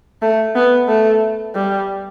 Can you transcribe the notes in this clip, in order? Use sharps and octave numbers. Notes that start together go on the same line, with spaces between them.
A3
B3
A3
G3